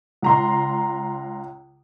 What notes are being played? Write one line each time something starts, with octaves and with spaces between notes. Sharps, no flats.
C#2 A#5 C6